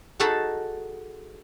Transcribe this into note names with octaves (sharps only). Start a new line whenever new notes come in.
D#4 F#4 G#4 A4 A5 B5